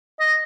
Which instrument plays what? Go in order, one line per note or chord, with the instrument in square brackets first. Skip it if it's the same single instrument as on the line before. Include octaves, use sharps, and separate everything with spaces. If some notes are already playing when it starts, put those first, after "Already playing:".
[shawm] D#5